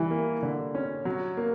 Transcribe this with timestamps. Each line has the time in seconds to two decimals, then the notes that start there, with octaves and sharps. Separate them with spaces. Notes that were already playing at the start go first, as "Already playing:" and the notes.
Already playing: E3 G3
0.11 A#3
0.43 D3
0.75 C#4
1.05 F#3
1.37 A#3